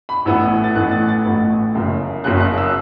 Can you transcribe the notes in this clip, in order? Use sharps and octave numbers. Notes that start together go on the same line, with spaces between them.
B5
A1 A2 E3 B3 E6
A6
A1 A2 E3 B3 F#6
A6
A6
A1 A2 E3 B3
F#1 F#2 C#3
F#1 F#2 C#3 F#6
F#6
E6